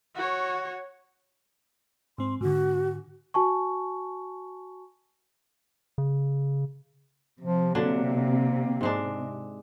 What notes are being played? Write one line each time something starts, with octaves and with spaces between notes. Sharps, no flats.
F#4 C#5
G#2 C4 C6
G#2 D3 F#4
F#4 G#5 A5 C#6
C#3
C3 F3
D3 F#3 A#3 D4
G#2 G#3 D4